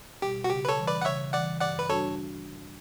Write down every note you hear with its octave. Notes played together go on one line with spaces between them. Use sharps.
B2 G3 G4
F#4
C#3 G4
B4
A4 C#5
E3 G3
B4 D5
F#5
C#3 C#5 E5
E3 G3 D5 F#5
G2 D5 F#5
B4
G3 D4 F#4 A4 C#5